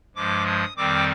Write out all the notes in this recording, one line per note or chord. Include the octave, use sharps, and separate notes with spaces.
G2 F3 G#3 D6
D#6
F2 D#3 G3 C4 D6